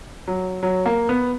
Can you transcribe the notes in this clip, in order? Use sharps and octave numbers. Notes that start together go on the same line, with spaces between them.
F#3
F#3
A#3
B3